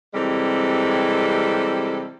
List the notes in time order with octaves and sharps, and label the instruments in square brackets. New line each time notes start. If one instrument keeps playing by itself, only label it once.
[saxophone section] C3 E3 G3 G#3 C4 A4